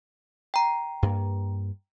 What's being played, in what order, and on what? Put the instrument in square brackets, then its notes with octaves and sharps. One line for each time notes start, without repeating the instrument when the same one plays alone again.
[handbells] G5 A#5
[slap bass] G2 A#3